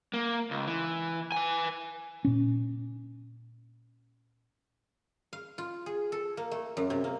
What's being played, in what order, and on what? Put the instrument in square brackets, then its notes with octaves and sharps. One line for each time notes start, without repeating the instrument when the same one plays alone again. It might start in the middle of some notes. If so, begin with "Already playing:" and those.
[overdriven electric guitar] A#3
C#2
E3
B4 G#5
[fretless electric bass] A#2 C#4
[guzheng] F5
F4
G#4
A4
A#3
A3
F#2
C3
A#3